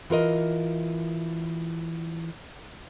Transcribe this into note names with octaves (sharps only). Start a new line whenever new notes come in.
E3 F4 A#4 D#5